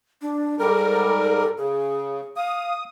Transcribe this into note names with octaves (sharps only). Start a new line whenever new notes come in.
D4
G#2 G3 A4 A#4
C#3 G#4
F5 D#6